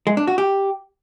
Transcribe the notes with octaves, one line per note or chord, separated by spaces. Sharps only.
G#3
D4
F#4
G4